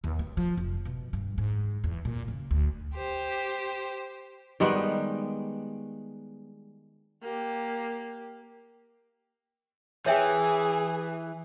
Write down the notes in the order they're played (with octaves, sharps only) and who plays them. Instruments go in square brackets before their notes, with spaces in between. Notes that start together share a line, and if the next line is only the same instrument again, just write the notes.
[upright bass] D#2
B3
F3
F1
B2
G2
G#2
E2
A#2
C#3
D2
[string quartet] G4 C5
[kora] D#3 G3 G#3 B3
[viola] A#3 G4
[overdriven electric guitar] E3 [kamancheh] G#4 [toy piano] C#5 E5 G5